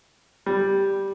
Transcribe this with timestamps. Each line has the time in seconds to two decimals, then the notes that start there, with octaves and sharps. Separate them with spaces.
0.46 G3